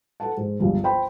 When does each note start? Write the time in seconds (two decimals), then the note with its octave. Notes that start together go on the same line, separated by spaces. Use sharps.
0.20 A4 B4 F#5 A5
0.37 G#2
0.60 G1 C#2 G2
0.83 B4 C5 G5 B5 C6